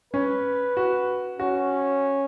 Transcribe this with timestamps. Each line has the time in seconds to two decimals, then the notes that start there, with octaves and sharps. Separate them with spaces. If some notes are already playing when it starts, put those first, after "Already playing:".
0.14 C#4 B4
0.77 F#4
1.39 C#4 F#4